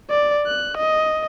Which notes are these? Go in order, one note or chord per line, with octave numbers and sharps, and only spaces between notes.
D5
F#6
D#5